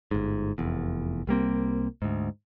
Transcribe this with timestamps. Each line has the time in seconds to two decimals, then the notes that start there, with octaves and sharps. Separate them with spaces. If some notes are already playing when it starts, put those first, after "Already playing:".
0.11 G1 G#2
0.58 F1 E2
1.27 C2 G3 A#3 C4
2.02 D2 G#2